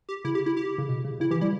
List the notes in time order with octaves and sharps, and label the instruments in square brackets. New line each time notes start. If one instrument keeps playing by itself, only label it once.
[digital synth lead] G4
[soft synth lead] C#3 [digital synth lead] E4
[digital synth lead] G4
E4
G4
[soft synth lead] C#3
B2
C#3
[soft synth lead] C#3 [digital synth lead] E4
[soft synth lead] E3 [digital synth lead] G4
[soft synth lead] G3 [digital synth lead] E4